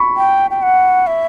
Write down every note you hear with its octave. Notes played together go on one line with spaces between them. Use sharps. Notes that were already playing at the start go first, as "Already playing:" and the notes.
Already playing: B5 C#6
G5
G5
F#5
E5